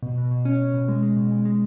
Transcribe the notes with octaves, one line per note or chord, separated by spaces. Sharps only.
B2
B2
B2
C#4
B2
B2
G#3
G#3
B2
G#3
G#3